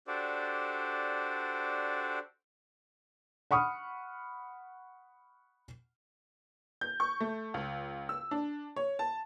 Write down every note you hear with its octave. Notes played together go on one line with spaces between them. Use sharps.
D4 F#4 G4 A4 C5 D5
F#5 B5 C#6 D#6 F6
G6
C#6
A3
C#2
E6
D4
C#5
A5